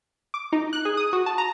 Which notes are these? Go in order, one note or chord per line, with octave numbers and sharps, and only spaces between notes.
D6
D#4
F#6
G#4
D#6
F#4
A5
A#5